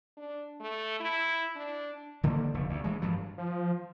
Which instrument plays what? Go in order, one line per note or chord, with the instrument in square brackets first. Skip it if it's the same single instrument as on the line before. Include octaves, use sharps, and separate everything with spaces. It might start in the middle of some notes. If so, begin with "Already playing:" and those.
[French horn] D4
A3
E4
D4
[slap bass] D3 D#3 G3 A#3
F1 D3
D2
E3 G#3
G2 F3 F#3
[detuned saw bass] F3